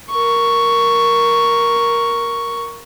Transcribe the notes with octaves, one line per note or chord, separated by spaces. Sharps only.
A#4 C#6